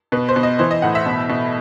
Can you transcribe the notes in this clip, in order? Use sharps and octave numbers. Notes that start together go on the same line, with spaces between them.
B2 B4
C5
B2
D#5
E3 C5
D#5
A2 F#5
E5
B2
B2